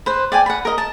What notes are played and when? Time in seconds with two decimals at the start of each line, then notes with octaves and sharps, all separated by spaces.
0.06 B4 C5
0.32 D5 G5 G#5
0.46 F#5 B5
0.65 A#4 D#5
0.78 A5